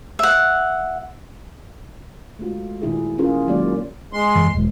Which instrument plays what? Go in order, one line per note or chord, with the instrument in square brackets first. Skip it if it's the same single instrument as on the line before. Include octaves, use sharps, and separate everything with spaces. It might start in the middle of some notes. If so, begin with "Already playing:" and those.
[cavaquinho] E5 F#5
[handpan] G#3 A3 F4 F#4
A#2 D#3 E4 G#4
C#4 E4 F4 G#4 A#4
D#3 F#3 G#3 A#3 D5
[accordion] G#3 C6
[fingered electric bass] F#2 E3
E1 G#3